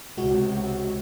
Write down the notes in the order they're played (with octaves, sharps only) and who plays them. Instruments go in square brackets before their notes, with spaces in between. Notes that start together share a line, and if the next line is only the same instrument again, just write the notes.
[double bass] C#2 C3 [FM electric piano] G#3 F#4